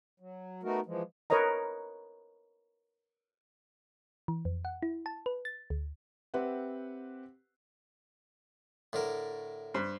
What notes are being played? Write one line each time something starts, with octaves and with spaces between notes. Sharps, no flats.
F#3
A3 B3 D#4 F#4 A#4
E3 F3 G#3
A#4 B4 C#5 D#5 A#5
E3
F2
F#5
E4
A5
B4
A6
D2
C4 G4 B4 C5 E5 F#5
A2 D3 A#4
G2 C5